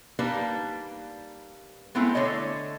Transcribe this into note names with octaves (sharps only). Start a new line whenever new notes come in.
G3 A#3 D4 D#4 B4 A5
G#3 A3 B3 C4 E4
D3 A3 C#5 D#5